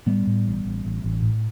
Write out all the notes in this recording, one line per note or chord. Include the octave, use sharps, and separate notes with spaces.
A2 G3 B3
A2
A1
A1
A1
A1
A2